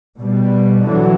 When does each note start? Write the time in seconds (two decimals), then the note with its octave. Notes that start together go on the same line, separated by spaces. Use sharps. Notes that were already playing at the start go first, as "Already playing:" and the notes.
0.17 B2 G3
0.85 D3 E3 F#3